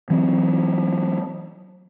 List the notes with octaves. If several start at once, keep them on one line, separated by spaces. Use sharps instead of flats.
E3 F#3 C4